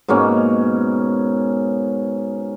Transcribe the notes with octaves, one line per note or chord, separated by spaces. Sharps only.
G#2 B2 A#3 C#4